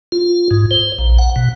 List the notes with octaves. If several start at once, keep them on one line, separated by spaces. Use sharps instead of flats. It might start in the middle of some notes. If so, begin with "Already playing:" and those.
F4
G#2
C5
A#1
F#5
B2